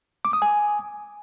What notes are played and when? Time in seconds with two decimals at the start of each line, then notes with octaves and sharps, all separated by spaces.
0.25 D6
0.33 D#6
0.42 G#5